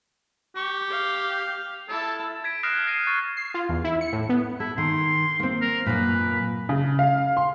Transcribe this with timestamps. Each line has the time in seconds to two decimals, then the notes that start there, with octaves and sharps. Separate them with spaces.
0.56 G4 C#6
0.91 F5
1.89 E4 A4 A5
2.44 G#6 B6 D7
2.63 D#6 F6 F#6 A#6 C7 E7
2.87 A#6 C7 D#7
3.07 C#6 A6
3.37 C7
3.54 F4
3.69 E2
3.84 E4
4.01 C#7
4.13 A2
4.29 B3
4.60 E4 A4
4.78 D#3 C6
5.40 A#3 C4
5.62 A#4
5.86 F#2 A#2 B4
6.69 C#3
6.99 F5
7.37 C6